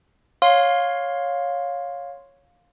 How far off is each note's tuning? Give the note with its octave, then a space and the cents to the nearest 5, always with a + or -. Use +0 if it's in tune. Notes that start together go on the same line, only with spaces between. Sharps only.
C#5 +0 F5 +15 C6 +0